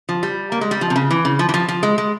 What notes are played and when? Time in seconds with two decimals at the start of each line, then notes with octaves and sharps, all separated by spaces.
0.09 F3
0.23 G3
0.52 A#3
0.61 G#3
0.71 G3
0.81 F3
0.90 C3
0.96 C#3
1.11 E3
1.25 C#3
1.39 F3
1.49 E3
1.54 F3
1.68 F3
1.83 G#3
1.98 G#3